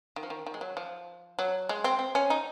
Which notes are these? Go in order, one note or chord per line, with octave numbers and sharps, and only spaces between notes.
D#3
F3
D#3
D#3
G#3
F#3
F3
F#3
G#3
C4
C4
C#4
D#4